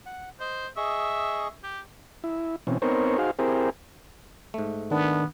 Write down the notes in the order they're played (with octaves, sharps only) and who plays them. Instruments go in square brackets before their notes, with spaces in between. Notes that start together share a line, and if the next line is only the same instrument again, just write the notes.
[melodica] F#5
[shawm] C5 [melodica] D#5
[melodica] G#4 D#5 C#6 [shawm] E5
[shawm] G4
[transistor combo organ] E4
B2 E3 C4 C#4
B3 C4 D#4 A#4 C5 C#5
D#4 F#4 G#4 C5 F5
C4 E4 G4 G#4 A#4 C5
[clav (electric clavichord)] G#2 A3
[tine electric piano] D#3 D4 [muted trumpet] B3